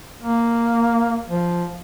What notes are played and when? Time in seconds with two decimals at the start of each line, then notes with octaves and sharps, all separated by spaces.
0.21 A#3
1.29 F3